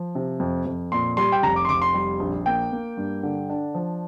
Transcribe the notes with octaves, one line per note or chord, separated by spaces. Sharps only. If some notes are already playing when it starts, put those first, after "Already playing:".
Already playing: F3
C3
F2
F2
A#2 C6
G3 C6
G5
F1 A#5
D6
C6
F1 D6
C6
G3
A#1
A#3 G5
A#3
G2
D3
D4
F3